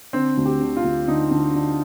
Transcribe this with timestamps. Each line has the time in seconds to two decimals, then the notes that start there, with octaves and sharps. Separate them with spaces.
0.13 D3 C4
0.37 D2
0.45 G4
0.61 D3
0.77 F4
0.84 D2
1.08 D3 D#4
1.31 D3
1.54 D3